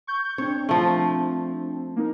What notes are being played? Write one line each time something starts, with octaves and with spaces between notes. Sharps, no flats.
C#6 G6
C4 D4 C#5
F3 A3
A#3 D#4 A#4